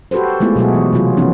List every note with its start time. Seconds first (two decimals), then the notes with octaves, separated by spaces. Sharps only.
0.11 F#4 G4 A4 B4 C5
0.40 G#3 A3 B3 E4 F4 G#4
0.56 B2 F#3 F#4 G#4
0.74 E3
0.93 C3 F#3 F4 G#4
1.17 E3 F3 B3 C#4 D#4